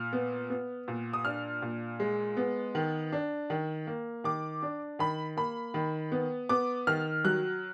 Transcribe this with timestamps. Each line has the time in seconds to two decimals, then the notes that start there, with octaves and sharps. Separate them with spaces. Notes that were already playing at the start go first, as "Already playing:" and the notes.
Already playing: A#2 F6
0.13 B3
0.50 B3
0.88 A#2
1.13 D#6
1.25 D4 F6
1.62 A#2
2.00 G#3
2.37 B3
2.75 D#3
3.12 D4
3.50 D#3
3.87 A#3
4.24 D#3 D6
4.62 D4
4.99 D#3 B5
5.37 A#3 B5
5.74 D#3
6.12 B3
6.49 B3 D6
6.87 D#3 F6
7.25 F#3 F#6